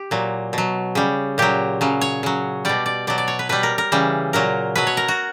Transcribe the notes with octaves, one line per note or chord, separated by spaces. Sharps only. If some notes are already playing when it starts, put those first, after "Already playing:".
Already playing: G4
A#2 F#3
B2 F#3
C#3 G3
A#2 F#3 G4
C#3 F#3
C#5
C#3 F#3
B2 G3 D5
D5
B2 F#3 D5
D5
C#5
B4
B2 G3 B4
A#4
A#4
C#3 E3 G3
A#2 F#3 A#4
B2 F#3 B4
C#5
A#4
F#4